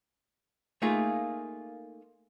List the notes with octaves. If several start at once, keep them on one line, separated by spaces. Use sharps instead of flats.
A3 A#3 D#4 F4 G#4